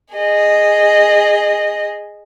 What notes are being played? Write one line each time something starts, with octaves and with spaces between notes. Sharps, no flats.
G#4 D#5